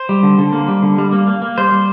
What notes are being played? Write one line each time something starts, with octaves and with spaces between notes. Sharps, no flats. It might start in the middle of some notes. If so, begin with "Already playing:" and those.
Already playing: C5
G3
D3
D3
A#3
G3
D3
G3
A#3
A#3
A#3
G3 C5
G3